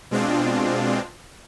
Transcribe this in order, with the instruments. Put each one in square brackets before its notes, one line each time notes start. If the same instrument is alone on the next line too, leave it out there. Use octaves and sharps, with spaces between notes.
[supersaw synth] B2 G#3 C4 D4 F4